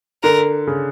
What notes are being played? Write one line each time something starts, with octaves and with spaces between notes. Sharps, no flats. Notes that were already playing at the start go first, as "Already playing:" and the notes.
D3 A#4
C#3